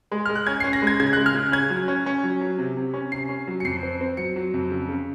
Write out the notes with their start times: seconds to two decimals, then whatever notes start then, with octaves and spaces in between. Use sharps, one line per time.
0.12 G#3
0.26 G#3 F6
0.35 F#6
0.46 C#4 G#6
0.60 C7
0.64 C#4
0.73 A#6
0.82 G#3 G#6
1.00 C#3 G#6
1.13 F#6
1.17 G#3
1.26 F6
1.35 C#3
1.52 C#4 G#6
1.70 F#3
1.88 C#4
2.06 C#4
2.23 F#3
2.41 F#3
2.58 C3
2.77 C3
2.94 C#4
3.12 C3 C7
3.29 C#4
3.47 F#3
3.60 C#7
3.65 F2 C7
3.83 C4
4.01 C4
4.17 F#3 C#7
4.36 F#3
4.54 F2
4.71 C#3
4.89 C#3